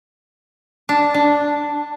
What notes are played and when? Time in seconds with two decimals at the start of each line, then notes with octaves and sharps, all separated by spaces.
0.89 D4
1.14 D4